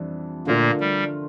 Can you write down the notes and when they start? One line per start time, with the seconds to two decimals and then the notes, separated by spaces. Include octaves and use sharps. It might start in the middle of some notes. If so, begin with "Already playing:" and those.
Already playing: F2 E3 G3 D4
0.47 A#2 D3 A3 A#3 D4 F4 A#4
0.80 G3